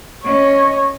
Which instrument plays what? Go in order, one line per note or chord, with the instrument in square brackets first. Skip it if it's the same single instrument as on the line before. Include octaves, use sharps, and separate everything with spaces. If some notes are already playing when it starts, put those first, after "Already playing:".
[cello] C#4 [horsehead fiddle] C#5 D#5